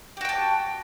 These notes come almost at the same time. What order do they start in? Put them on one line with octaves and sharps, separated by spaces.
G4 F#4 G5 A5